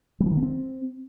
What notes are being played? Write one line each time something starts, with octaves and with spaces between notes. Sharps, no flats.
G3
F3
D#3
B3
C4